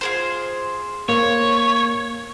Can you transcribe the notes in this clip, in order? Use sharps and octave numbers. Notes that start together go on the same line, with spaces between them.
F4 G#4 C5
A#3 C#5